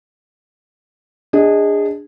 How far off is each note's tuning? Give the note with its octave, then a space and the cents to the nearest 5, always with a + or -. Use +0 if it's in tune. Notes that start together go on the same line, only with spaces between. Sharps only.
D4 +0 G#4 -20 D#5 +15